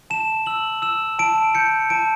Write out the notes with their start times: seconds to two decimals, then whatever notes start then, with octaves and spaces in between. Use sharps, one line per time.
0.10 A5 E7
0.46 E6 F#7
0.82 E6 E7
1.19 A5 D7
1.55 G6 C#7
1.90 A5 D7